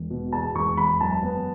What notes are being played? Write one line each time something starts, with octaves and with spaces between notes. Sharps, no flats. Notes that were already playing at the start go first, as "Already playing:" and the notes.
Already playing: E1
B2
E2 A5
E1 C#6
E1 B5
F#2 A5
B3